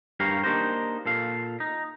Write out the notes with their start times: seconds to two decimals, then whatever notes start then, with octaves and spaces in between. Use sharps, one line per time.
0.20 G2 G4 A#4 C#5 F5
0.44 A#3 D4 D#4 G4 A#4 C5
1.06 A#2 A4 F5
1.60 D#4